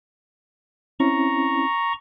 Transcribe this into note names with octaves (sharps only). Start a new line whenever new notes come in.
C4 C#4 E4 A#5 C#6